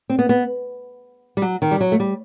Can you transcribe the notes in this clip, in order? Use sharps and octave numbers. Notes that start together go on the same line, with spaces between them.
C4
B3
B3
G3
F#3
D#3
G3
F#3
A3
G3